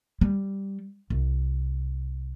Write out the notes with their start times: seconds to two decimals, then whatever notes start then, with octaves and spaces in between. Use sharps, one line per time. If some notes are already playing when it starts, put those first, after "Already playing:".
0.21 G3
1.10 C2